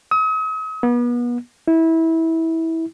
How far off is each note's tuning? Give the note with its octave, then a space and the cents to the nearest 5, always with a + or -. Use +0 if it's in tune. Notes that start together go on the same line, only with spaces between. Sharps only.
D#6 +40
B3 -35
E4 -20